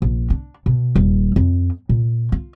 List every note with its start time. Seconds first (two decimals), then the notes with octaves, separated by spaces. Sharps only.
0.02 A#1
0.30 D4
0.66 B2
0.96 D#1
1.36 F2
1.89 A#2
2.32 F4